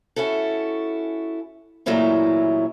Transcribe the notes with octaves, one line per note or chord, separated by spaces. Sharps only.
C#4 E4 F#4 A4
A#2 E3 F#3 A3 C#4 E4